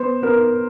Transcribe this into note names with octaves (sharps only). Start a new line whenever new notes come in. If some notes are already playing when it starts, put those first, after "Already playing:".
Already playing: B3 C5
B3 A#4